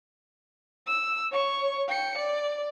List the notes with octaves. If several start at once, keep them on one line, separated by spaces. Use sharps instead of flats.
E6
C#5 C#6
G5 C#7
D5